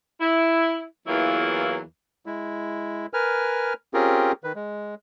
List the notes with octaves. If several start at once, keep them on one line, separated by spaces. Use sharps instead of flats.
E4
E2 E3 F#3 A#3 E4 F4
G#3 E4
A#4 B4 G#5 F6
C4 C#4 F4 G4 G#4 A#4
D#3 B4
G#3